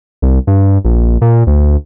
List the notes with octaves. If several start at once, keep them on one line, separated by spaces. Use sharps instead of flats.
C2
G2
A#1
A#2
D2